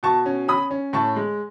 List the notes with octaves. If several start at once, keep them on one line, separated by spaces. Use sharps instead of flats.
B2 A5 C#6
C#4
C#4 B5 D#6
C#4
A2 A5 C#6
G#3